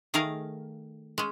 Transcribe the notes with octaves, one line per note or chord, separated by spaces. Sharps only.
D#3 A3 G#4 A#4 F5
G#3 C#4